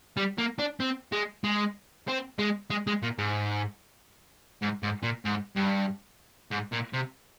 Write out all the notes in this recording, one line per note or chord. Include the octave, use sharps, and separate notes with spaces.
G3
A#3
D4
C4
G#3
G#3
C4
G#3
G#3
G#3
A#2
G#2
G#2
G#2
A#2
G#2
G2
G#2
A#2
C3